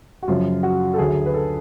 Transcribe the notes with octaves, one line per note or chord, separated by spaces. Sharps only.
F#4
F#2 C#3 F3 F4
F#4
A4
D2 D3 F#3 G#4
B4
A4